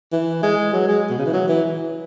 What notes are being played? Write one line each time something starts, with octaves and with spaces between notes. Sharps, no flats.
E3
G#3
F#3
G#3
B2
C#3
E3
F#3
E3